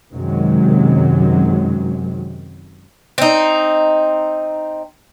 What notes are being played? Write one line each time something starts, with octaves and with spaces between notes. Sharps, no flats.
F#2 C3 D#3 F#3 G#3
C4 D#4